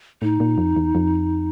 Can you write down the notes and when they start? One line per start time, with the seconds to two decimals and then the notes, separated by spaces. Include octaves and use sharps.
0.22 A2 D#4
0.40 A#2
0.58 F2
0.76 E2
0.95 F2